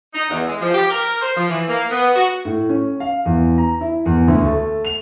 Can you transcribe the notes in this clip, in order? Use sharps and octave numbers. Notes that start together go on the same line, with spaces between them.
D#4
E2
G#3
F3
G4
A#4
C5
F3
E3
A#3
B3
F#4
A2
C#4
F5
E2
A#5
E4
E2
D2
A3
F7